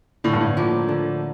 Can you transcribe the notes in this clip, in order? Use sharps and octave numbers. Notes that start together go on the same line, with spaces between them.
A2 D3
G2
A2
F3 A#3
D3